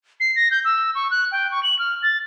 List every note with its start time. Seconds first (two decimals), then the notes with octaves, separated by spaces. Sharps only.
0.20 C7
0.36 A#6
0.51 G6
0.65 E6
0.95 C#6
1.11 F#6
1.32 G5
1.51 C#6
1.63 F#7
1.79 F6
2.03 A6